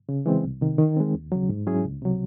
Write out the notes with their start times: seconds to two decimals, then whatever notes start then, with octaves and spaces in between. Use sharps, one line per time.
0.09 C#3
0.26 E3 G#3 C4
0.44 C2
0.61 C3 D#3
0.78 D#3
0.96 G#3 C4
1.14 D#2
1.32 C#3 F#3
1.49 G#2
1.67 F#3 C#4 E4 G#4
1.85 C#2
2.02 C3 F#3